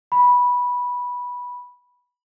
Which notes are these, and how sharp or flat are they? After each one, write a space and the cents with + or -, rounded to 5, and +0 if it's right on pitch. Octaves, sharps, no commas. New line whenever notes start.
B5 -10